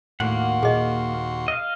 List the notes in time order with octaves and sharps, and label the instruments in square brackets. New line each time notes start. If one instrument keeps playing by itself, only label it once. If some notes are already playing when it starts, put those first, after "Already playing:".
[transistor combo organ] D#2 F#4 C6 [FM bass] A2 [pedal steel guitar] A#3 F#5
[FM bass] A#2 [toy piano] G#4 D#5
[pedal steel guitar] D#5 F5